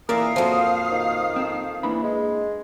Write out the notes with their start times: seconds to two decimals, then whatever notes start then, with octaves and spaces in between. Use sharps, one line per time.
0.09 A#2 E3 A#4 D5 E5 F5 D#6
0.36 F2 A#2 F3 A#3 F#4 C5
0.92 D#3
1.36 C4 A4
1.83 E3 A#3 D4 B5
2.03 G#3